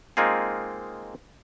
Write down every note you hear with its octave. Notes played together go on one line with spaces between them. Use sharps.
G#3 A#3 C4 D#4 F4 G#4